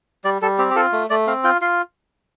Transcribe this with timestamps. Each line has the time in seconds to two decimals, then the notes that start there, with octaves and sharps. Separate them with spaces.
0.24 G3 D5
0.42 G3 A4
0.58 C4 G4
0.71 G4
0.76 F4 A4
0.93 A3
1.10 A3 D5
1.27 C4 F5
1.44 F4 G5
1.61 F4 C6